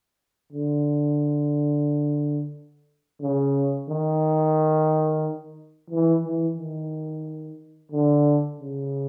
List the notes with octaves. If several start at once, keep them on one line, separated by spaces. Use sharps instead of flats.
D3
C#3
D#3
E3
E3
D#3
D3
C#3